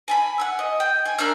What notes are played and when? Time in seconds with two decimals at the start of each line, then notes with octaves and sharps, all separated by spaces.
0.08 G#5 A5 B5
0.38 F#5 G#5 E6
0.59 D#5
0.80 G5
1.06 G#5
1.18 A#3 D4 E5 F6